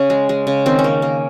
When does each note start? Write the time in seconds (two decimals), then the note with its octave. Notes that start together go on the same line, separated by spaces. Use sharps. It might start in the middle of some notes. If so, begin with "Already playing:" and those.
Already playing: C#3 C#4
0.10 G#3
0.29 G#3
0.47 C#3
0.66 D#3 C4
0.79 C#4
0.84 A#3
1.02 A#3